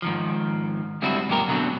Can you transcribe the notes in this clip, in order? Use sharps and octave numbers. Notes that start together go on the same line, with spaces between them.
G#2 D#3 F3
D3 G3 G#3 C4 E4 F#4
F#2 A#2 G4 A#4
G#2 B2 D3 E3 F#3 C4